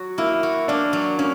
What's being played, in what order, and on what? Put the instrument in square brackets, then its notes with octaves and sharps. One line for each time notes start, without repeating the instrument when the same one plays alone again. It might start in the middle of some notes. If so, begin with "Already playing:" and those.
Already playing: [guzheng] F#3 F#4
[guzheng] A#3 [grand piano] E4
[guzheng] F#4
[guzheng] A#3 [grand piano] D4
[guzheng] F#3
[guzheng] A#3 [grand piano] C#4